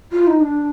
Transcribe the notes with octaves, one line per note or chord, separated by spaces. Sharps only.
F4
D#4
D4